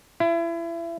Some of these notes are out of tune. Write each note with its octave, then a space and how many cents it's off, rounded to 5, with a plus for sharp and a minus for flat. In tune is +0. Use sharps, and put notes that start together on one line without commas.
E4 +30